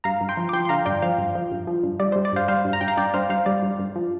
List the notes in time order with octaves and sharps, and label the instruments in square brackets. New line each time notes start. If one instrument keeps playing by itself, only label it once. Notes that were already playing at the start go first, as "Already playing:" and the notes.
[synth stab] G2 F5 A#5
G2
G5 C6
F3
D6
F3 G5 C6
C6
D3 F5 A#5
G2 D5 G5
F3 C5 F5
G2
F3
G2
F3
G2
G3 D5
G3 C5
D5
G2 C5 F5
G3 C5 F5
G2
A#5
G2 G5
F5 A#5
G2 D5 G5
G2 C5 F5
G2 C5 F5
G3 D5
G2
G2
F3